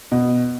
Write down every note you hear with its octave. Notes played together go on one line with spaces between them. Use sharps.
B2